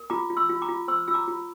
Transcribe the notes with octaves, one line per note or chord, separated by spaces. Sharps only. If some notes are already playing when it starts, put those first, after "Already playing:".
Already playing: A#4
F4 A#5 D6
F4
C6 E6
F4
A#5 D6
F4
C5 C6 E6
F4 E6
A#5 D6
F4